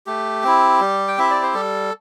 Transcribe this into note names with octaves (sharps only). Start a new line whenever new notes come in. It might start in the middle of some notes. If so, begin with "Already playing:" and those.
A3 G4
C4 E4
G3
G5
C4 E4 E5
D5
C5
G3 A4